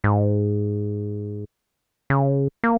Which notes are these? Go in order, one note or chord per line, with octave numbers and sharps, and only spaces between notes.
G#2
C#3
A#3